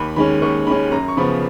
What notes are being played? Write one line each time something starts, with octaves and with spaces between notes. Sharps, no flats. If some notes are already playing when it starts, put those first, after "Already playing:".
Already playing: D#2 B5
D#3 G#3 C#4 B5
D#2 C#6
D#3 G#3 C#4 B5
F#2 A#5
C#6
C#3 F3 B3 B5